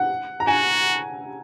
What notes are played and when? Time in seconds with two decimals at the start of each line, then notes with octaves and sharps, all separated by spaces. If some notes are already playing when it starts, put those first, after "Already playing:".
Already playing: F#5
0.40 A#5
0.47 F#4 G#5